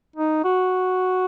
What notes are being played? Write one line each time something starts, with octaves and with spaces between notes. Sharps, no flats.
D#4
F#4